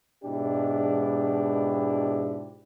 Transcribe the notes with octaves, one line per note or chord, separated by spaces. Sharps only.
G#2 B2 G#3 D4 E4 G4